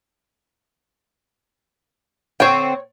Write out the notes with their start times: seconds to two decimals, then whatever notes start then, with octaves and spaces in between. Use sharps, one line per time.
2.40 D3 C4 C#5 G5